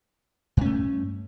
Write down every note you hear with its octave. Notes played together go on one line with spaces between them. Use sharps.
G2 A3 C#4